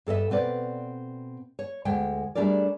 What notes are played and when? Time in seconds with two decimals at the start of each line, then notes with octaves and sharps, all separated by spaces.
0.07 G2 A4 D#5 E5
0.30 B2 C4 B4 D5
1.59 C#5
1.85 D2 G#3 G5
2.35 G3 A3 D4 G#4 A#4 D5